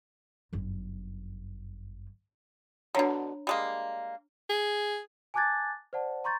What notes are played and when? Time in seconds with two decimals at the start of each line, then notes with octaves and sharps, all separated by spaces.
0.53 G1 F#2
2.95 B2 D3 D4 C#5 A#5
3.47 G3 G#3 A#3
4.49 G#4
5.34 G#5 A5 D6 F#6 G#6 A6
5.93 C5 D5 F#5 A5
6.24 A#5 C6 C#6 G6 A6